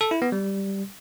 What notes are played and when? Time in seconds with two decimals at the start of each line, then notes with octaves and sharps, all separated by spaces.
0.01 A4
0.11 E4
0.22 B3
0.32 G3